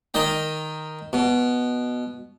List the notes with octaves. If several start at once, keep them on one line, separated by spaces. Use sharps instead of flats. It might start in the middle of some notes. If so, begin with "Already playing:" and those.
D#3 D#5 G5
B2